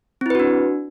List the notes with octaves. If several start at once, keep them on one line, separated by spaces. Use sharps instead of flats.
C4 D4 E4 F#4 B4